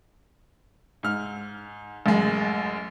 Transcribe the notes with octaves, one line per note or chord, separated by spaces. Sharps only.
G#2 F6
A1 F#2 G#3